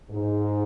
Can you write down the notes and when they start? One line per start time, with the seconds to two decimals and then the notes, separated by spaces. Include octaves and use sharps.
0.10 G#2